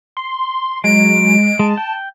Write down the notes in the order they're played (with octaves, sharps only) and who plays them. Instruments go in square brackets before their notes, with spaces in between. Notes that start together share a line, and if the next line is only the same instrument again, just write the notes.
[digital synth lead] C6
[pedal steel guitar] F#3 [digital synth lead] G#3 [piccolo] D7
[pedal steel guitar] G#3 [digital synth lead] A5
[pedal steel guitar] G5